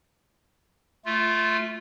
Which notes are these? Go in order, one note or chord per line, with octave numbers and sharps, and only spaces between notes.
A3 F4